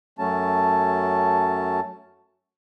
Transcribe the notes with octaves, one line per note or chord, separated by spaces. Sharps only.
F#2 F#3 A3 C#4 A5